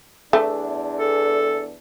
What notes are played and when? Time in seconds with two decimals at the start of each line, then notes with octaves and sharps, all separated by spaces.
0.33 E2 A3 D4
0.99 A4